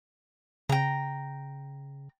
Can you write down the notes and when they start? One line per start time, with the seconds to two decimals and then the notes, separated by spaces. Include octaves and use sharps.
0.69 C#3 G5 A#5